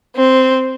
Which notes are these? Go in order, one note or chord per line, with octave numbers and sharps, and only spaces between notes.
C4